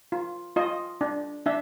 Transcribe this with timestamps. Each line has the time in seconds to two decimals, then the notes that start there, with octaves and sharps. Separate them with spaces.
0.12 F4
0.56 F4 D#5
1.01 D4
1.46 D4 E5